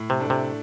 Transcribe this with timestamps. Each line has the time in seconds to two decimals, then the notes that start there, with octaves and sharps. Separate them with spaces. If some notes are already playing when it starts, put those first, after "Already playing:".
Already playing: A2
0.10 C3
0.20 A3 D4
0.30 C3